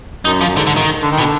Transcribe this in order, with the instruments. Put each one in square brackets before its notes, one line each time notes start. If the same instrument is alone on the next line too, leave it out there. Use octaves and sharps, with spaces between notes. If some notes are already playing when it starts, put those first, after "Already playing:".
[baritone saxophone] F#2 [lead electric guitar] D#4
[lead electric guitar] F3
[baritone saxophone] F#2
[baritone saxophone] G#2 [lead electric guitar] D3
[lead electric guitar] D3
D#3
[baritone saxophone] D3
D#3
[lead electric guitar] B2
[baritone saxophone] D3